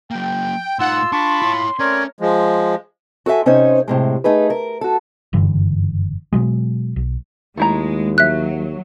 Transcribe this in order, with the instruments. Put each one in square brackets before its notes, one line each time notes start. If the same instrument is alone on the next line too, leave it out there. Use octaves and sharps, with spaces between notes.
[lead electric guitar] F#3 A#3 [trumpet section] G5
[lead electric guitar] A2 D#4 [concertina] F4 E6 [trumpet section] F#5 [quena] C6
[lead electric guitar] D4 [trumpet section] F4 B5 [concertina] A5 C#6 D6
[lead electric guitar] E4 C#5
[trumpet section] A3 C4 D5 [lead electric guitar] C#4 [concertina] A#4 C#5
[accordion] F3 G#3
[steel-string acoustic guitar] F#4 A4 B4 E5 G#5
C3 C#4 D#4 C5 C#5 D#5
A2 C3 G#3
A3 D#4 G#4 B4
A#4
F#4 A4
[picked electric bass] F#1 G2 D3 E3
B2 F#3 G#3
B1
[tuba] D#2 [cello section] G#3 [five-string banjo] A3 E4 A#5
[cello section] F#3 [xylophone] E5 F#6